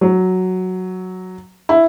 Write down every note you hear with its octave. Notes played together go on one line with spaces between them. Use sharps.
F#3
E4